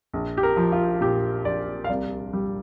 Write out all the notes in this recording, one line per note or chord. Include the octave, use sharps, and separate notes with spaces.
A#1
G4
A#4
F3
F4
A#2 G4
A#1 D5
F5
C2 D5
G3